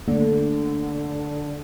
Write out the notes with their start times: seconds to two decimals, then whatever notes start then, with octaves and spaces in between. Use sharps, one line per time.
0.08 D3 A3 A#3